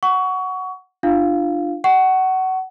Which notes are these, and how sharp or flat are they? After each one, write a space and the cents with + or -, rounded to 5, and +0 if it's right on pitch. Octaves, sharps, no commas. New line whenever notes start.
F#5 +0 C#6 +20
D4 +15 F4 -20 F5 +0
F#5 +25 C#6 +0